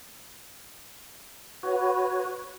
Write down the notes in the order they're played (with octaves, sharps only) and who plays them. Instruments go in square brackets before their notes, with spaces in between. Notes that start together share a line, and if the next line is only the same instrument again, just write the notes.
[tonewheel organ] F#4 B4 C#5